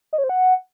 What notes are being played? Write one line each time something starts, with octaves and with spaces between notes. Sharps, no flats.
D#5
C#5
C5
F#5